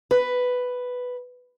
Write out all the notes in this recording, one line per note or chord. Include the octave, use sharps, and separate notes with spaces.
B4